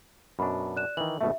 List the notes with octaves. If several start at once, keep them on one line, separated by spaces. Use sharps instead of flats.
F#2 B2 D4 B5
D5 F#6 E7
D#3 E3 F#7
G#1 B2 A3 E5